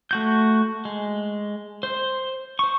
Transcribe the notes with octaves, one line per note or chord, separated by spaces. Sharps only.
A3 F#4 G6
G#3
C5
C5 C#6